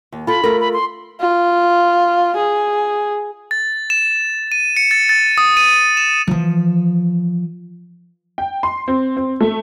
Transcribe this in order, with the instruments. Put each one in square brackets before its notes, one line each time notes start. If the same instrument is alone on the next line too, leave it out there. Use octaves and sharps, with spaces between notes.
[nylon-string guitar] D#2
[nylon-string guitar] F4 A4 [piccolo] B5
[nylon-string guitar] A3 F4 A#4
[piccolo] B5
C6
[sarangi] F4
G#4
[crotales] A6
E7
D#7
C#7
A6
A6
D#6
D#7
E7
[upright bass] E3 F3
[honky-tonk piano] G5
C6
C4
C4
A3